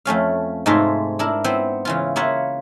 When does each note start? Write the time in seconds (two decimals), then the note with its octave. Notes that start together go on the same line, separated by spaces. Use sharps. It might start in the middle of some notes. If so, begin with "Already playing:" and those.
0.05 F2 A3 C#4 F5
0.66 G#2 C3 G#3 A3 F4 E5
1.19 D4 E4 A#4
1.44 B3 C4 E4 C5
1.85 C#3 E3 F4
2.16 A#3 E4 F4 C#5 E5 F#5